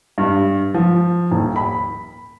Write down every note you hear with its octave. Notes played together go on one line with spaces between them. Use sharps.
G2
F3
D#1
B5